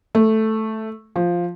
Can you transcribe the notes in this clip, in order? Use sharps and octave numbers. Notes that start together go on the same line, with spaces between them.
A3
F3